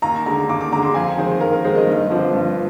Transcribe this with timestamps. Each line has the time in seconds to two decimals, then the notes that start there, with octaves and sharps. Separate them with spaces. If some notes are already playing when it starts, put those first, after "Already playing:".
0.02 D#2 A#5
0.26 D3 G#3 A#5
0.49 D#2 D6
0.61 D6
0.72 D3 G#3 A#5
0.83 C6
0.94 F2 G#5
1.18 D#3 G#3 C5
1.40 F2 A#4
1.53 A#4
1.64 D#3 G#3 C5
1.75 D#5
1.87 G2
2.10 D3 F3 C4
2.33 G2